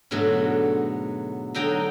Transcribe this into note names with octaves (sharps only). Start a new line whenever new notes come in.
G#2 B2 D3 F#3 A3
D3 F#3 D#4 G5 A#5